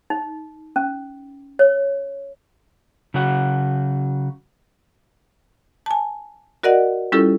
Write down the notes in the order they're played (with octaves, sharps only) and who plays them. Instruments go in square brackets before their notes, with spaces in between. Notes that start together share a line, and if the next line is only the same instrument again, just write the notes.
[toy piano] D#4
C#4
C#5
[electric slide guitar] C#3 F#3 F#4 F#5
[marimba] G#5 A5
F#4 A#4 D5 D#5 F#5
G3 C#4 E4 F4 G4 A4